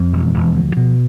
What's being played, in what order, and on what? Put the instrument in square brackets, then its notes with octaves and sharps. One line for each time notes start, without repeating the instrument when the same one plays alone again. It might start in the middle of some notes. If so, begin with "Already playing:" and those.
Already playing: [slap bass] F2 F3
E1
E1
D2
B2